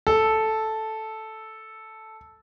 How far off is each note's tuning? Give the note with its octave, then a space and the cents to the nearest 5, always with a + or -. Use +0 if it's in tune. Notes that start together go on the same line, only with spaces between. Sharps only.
A4 -5